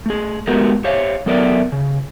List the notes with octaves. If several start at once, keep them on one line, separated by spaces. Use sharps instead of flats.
A3 G#4
G#3 A3 B3 F#4 G4 A#4
G4 C5 C#5 E5 F5
F#3 B3 A4 A#4 D5 E5
C#3